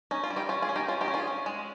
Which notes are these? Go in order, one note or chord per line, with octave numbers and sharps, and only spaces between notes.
C#4 D#4
F4
G3
D#4 G4
C#4 F4
F4 G#4
C#4
D#4 G4
C#4 F4
D#4 G4
C#4
F4 G#4
C#4
G#3